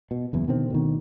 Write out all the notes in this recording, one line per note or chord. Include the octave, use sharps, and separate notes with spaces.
B2
F#1 E2 E3
B2 D3 D#3 C4
D2 B2 D#3